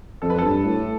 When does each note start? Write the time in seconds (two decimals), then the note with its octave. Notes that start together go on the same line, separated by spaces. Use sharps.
0.22 F2 A4
0.30 B4
0.39 G2 A4
0.65 A2